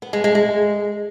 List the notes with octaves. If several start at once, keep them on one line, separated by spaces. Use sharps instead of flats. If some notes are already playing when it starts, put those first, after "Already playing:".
B3
G#3
G#3
G#3